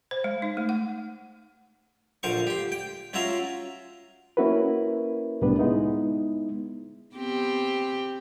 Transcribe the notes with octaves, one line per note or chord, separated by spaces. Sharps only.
C5
G#3
D#4
A3
F#5
A#1 D3 C5 F5 C#6
G4 C6
G5
C#4 F4 F#4 E5 A#5 C6
A#3 C#4 E4 F#4 A#4 B4
C2 A2 G3 B3 D4 B4
G#3 B3 D#4 E4
B3 C4 G4